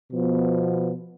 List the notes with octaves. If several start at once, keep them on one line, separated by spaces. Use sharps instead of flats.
B2 F3 B3